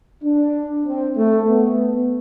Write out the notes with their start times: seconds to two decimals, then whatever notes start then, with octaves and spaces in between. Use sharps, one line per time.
0.23 D4
0.86 C4
1.17 A3
1.47 B3